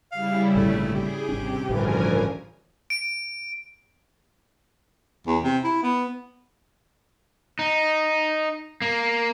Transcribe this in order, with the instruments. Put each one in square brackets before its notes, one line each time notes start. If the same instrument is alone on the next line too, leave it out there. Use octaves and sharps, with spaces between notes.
[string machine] C#3 G3 E4 [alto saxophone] F5
[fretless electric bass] G#1 A#2 D3 [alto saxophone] A3
[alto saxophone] G4 [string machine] G#4
[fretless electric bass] G#1 C#4 D4 [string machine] C3
[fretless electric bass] A1 G2 [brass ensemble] D2 C#3 E3 [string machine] F3 A#4 G#5
[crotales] D7
[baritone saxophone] E2
C3
E4
B3
[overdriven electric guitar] D#4
A#3